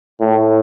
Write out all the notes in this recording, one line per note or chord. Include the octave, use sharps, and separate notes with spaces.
A2